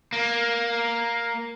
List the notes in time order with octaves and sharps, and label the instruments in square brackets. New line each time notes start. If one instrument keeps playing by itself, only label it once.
[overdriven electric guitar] A#3